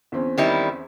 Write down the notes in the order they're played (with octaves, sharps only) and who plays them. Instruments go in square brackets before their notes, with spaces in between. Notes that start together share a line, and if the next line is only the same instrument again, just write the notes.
[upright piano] E2 C4 C#4
[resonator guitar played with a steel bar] D#3 G3 E4